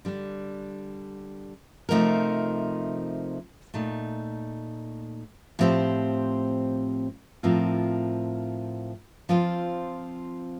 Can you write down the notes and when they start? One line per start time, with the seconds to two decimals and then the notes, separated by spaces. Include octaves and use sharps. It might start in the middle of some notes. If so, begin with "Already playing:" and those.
0.05 D3 G3 D4
1.89 C3 F3 A3 D#4 A#4
3.74 A#2 A3 D#4
5.59 A2 F3 C4 G4 C5
7.43 A2 F3 C4 F4 A#4
9.29 F3 C4 F4 C5